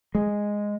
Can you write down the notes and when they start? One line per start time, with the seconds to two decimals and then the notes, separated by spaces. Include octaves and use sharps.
0.15 G#3